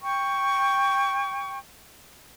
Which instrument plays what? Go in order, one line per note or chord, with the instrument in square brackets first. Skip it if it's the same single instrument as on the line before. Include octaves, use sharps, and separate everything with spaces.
[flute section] G5 C#6